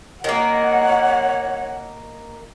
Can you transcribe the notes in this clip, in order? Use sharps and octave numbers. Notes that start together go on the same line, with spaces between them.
D#3 A#3 C#5 F#5